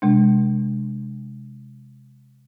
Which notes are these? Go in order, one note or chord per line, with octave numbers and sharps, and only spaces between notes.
C3 G#3 D4